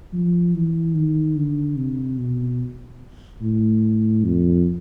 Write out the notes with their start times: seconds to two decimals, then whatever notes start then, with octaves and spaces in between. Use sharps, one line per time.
0.13 F3
0.54 E3
0.95 D#3
1.36 D3
1.77 C3
2.18 B2
3.42 A2
4.24 F2